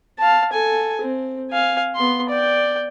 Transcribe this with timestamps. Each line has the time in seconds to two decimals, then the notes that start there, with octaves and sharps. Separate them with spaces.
0.19 F5 A5
0.53 A4 G#5
1.01 C4
1.51 F5 G#5
1.96 B3 C6
2.30 D5 G5